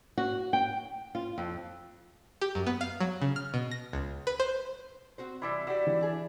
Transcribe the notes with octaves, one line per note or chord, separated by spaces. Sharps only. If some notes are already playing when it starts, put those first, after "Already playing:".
F#4
G5
F4
F2
G4
F#2
B3
F5
F#3
C#3
F6
B2
A#6
C#2
B4
C5
C4 F#4 C5
C3 E3 G3 E4 D5 E5
F#4 G4 D5 E5
E3
D4 G#4